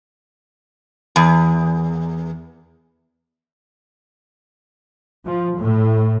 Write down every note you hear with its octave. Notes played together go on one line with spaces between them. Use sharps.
E2
F3
A2